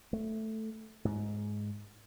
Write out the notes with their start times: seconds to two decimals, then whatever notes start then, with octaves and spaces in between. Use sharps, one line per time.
0.13 A3
1.05 G#2